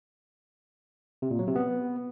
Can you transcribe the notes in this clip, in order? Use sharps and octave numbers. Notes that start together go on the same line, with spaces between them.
C3
A#2
F#3
C3
B3